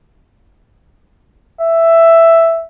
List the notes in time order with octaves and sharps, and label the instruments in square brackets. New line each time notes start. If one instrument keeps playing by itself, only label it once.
[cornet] E5